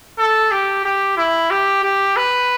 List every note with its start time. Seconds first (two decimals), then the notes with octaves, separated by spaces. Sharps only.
0.19 A4
0.51 G4
0.84 G4
1.17 E4
1.51 G4
1.83 G4
2.17 B4